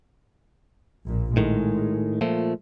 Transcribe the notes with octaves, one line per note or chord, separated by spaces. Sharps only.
A#1 A#2
A2 D#3 G#3
A#2 F3 A3